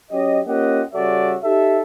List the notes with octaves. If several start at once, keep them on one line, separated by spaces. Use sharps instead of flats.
F#3 C#4 G4 D#5
A#3 C#4 F4 G4 D#5 F#5
C#3 G3 F#4 A4 D5 E5
D#4 G4 A4 E5